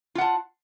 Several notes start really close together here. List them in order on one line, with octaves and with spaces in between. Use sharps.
F4 F#5 A5